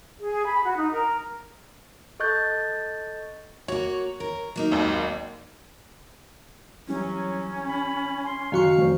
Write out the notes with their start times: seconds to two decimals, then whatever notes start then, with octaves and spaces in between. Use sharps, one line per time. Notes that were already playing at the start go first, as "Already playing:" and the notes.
0.20 G#4
0.46 B5
0.64 F#4
0.77 D#4
0.92 A#4
2.20 A4 D#5 C#6 F#6 G6 A6
3.68 A#3 F#4 C#5
4.20 A#4
4.56 F#3 A#3 D#4
4.72 G#1 D#2
6.88 E3 F#3 G3 C#4
7.68 B5
8.26 C6
8.52 F#1 D#3 F#4 F5 C#6
8.77 F1 C5